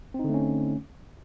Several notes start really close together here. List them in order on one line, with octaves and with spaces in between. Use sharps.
C4 D#4 D3 A3 C#4